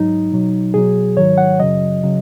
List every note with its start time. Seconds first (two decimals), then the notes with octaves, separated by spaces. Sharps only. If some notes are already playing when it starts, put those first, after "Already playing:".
Already playing: G#2 F#3 D#4
0.33 B2 F#3
0.74 B2 F#3 G#4
1.17 G#2 D#3 F#3 C#5
1.38 F#5
1.60 F#2 C#3 F#3 D#5
2.03 C#3 F#3